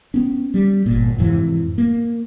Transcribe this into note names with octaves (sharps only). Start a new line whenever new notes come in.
B3 C#4
G3
G1 A#2
F2 G#2 C3 E3
A#3